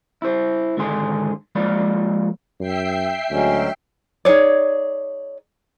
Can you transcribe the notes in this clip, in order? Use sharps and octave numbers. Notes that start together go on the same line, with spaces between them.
E4 C5
G#2 D3 D#3 G#4 C6
F3 G#3 A#3 D5 B5
F#2 E5 G5 C7
D2 F#3 G#3 C#4
D#4 G#4 C#5 D5